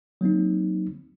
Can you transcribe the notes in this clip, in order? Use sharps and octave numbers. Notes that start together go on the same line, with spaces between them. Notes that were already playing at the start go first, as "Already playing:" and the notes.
F#3 A#3 C4 D#4